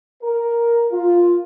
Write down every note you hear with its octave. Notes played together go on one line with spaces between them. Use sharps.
A#4
F4